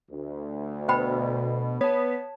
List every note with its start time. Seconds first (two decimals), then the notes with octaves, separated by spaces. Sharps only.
0.10 D2
0.88 B2 C5 G5 B5
1.81 B3 C#5 A5